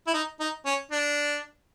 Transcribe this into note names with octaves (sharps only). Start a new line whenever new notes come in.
E4
D#4
D#4
C#4
D4